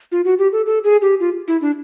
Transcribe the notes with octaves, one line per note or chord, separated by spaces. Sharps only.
F4
F#4
G4
A4
A4
G#4
G4
F4
E4
D4